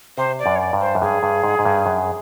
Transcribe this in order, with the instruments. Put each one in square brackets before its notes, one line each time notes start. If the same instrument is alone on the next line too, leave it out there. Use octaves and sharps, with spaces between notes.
[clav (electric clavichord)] C3 [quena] C5
[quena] D5
[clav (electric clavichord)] F#2
[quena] C#5
D5
[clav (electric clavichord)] G2
[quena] C5
[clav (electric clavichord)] F#2
[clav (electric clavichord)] G2 [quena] G#4
[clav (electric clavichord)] G2
G#2
G#2
G2
F#2